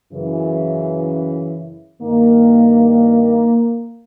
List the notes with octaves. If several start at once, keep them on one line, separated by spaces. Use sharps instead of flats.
F#2 C#3 E3
G2 D#3 A#3